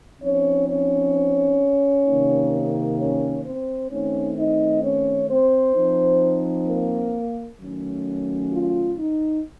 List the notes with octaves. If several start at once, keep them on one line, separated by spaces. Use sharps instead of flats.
F3 C4 C#4 D#4 C#5
C#4 C#5
C3 D#3 A#3 D#4
C#4 C#5
C4 C5
D#3 A3 C4 C#4 D#4 C#5
D#4 D#5
C#4 C#5
C4 C5
F3 C4 D#4
A#3 A#4
D#3 F#3 A3 C#4
F4
D#4